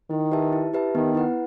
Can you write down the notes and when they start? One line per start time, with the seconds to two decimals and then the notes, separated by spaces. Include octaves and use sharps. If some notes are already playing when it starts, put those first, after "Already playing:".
0.10 D#3 E4
0.32 G4 B4 E5 A5
0.53 E4
0.74 G4 B4 E5 A5
0.95 D#3 B3
1.15 E4 B4 F#5